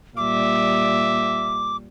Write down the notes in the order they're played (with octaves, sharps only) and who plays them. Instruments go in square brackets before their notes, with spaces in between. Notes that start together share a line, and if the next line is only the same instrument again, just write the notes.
[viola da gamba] A#2 G3 [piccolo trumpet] E5 [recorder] D6